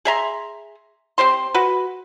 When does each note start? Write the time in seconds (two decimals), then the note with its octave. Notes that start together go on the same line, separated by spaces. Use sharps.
0.05 G#4 E5 A#5 C6
1.18 C4 G4 C5 C6
1.54 F#4 B4